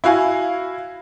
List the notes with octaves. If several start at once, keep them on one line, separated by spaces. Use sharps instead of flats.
E4 F#4 F5 G#5